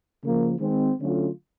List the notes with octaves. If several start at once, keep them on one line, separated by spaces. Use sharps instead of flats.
C#3 F3 A#3
D#3 G#3 C4
D3 F#3 A3 C#4 F4